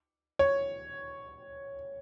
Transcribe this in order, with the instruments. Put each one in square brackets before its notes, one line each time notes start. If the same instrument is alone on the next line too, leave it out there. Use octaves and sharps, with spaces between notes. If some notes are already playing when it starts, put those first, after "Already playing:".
[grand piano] C#5